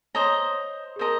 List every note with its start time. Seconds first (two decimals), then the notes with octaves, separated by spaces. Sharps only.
0.14 C5 C#5 D#5 A#5
0.96 G#4
0.99 A#4 C5 D#5 A#5